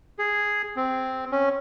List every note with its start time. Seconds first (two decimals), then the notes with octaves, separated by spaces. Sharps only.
0.19 G#4
0.76 C4
1.32 C#4